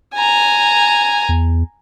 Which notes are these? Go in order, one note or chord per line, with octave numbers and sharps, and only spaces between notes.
G#5 A#5
E2